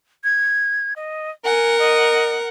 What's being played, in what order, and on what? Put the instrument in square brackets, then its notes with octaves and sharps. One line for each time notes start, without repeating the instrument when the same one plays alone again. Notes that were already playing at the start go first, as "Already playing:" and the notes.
[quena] G#6
D#5
[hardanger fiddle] A#4 F#5 [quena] G#5
[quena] D#5